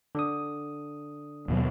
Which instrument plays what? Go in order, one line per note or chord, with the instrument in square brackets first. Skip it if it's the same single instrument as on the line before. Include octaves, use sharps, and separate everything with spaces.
[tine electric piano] D3 D4 D#6
[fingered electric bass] D#2 B2 F#3